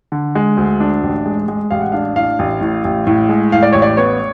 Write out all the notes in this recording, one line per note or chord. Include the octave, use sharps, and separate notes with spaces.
D3
G#3
D2
D4
A1
G#3
G#3
A1 F5
F#5
D4 F5
A2 F5
A1
A2
A1
A2
G#3
A2 F5
D5
A1 C#5
D5
B3 C#5